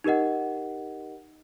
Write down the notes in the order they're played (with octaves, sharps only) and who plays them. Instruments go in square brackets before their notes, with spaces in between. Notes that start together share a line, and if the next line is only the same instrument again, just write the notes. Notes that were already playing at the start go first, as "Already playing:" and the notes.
[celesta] D#4 G4 A#4 D#5 F#5